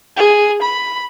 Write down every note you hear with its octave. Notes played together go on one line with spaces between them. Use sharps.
G#4
B5